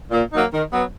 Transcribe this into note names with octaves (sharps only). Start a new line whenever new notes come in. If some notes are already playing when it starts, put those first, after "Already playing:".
A#2
F#3 A#3 D#4
D#3
F#3 B3